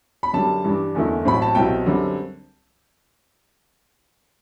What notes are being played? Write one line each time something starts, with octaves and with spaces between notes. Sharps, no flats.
B5
F#2 D3 G3 A5
G2 E3 G3 D4
F#1 E2 D3 A3 E4
A1 A2 F#3 C4 B5
A5
C2 B2 F#3 C4 E4 G5
F#2 D3 G3 C4